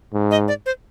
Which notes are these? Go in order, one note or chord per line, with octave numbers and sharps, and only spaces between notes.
G#2
D#5
D5
C5